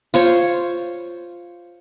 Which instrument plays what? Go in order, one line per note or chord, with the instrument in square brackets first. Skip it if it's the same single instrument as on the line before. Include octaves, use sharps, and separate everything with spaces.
[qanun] F4 C5 C#5